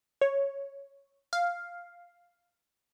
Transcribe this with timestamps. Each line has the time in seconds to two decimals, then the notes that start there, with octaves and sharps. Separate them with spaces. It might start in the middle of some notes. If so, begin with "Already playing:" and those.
0.21 C#5
1.33 F5